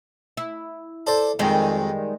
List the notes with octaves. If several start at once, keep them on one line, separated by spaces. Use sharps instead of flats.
E4
A4 C5 D5
F2 G#2 D#3 G3 G#3